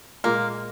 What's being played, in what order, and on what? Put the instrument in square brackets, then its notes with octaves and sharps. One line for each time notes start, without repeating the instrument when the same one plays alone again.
[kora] A#2 G#3 [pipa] A#3